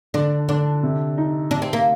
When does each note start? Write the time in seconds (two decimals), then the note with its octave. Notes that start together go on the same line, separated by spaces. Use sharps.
0.14 D3 D4
0.49 D3 D4
0.83 C3
1.17 D#4
1.51 C3 D4
1.62 C4
1.73 A#3